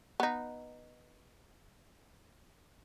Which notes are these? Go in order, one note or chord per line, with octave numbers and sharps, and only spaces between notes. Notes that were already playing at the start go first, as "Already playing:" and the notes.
B3 D#4